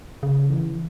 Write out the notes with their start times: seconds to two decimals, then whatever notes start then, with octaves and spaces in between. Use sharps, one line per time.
0.23 C#3
0.49 E3